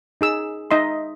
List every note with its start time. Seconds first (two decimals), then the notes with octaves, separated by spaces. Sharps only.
0.21 D#4 G#4 E6
0.71 D#4 D#5 E5 C6